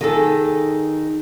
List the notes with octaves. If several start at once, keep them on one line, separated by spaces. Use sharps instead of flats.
D#3 G#4 A4